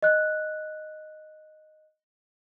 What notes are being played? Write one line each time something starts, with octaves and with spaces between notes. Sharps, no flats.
D#5 F#6